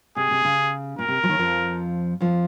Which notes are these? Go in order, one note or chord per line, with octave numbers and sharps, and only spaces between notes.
C3 G#4
C3
C#3
A#2 A#4
C3
F3
D#2 D#3
F2 F3
F2 F3